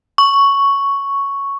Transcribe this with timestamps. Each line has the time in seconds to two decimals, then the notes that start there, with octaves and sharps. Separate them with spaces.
0.18 C#6